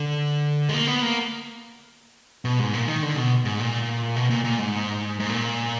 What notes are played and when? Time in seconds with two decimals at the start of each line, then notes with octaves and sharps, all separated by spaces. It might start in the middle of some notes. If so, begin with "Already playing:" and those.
Already playing: D3
0.69 G#3
0.74 A#3
0.87 B3
1.02 A#3
2.45 B2
2.59 G#2
2.74 A#2
2.88 D#3
3.02 D3
3.16 B2
3.45 G#2
3.59 A#2
4.16 B2
4.30 A#2
4.44 A#2
4.58 G#2
5.20 G#2
5.29 A#2